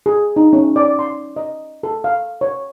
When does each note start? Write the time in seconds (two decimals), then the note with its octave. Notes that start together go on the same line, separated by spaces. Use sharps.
0.06 G#4
0.36 D#4
0.53 C#4
0.76 D5
0.99 C6
1.36 D#5
1.83 A4
2.04 F5
2.41 C#5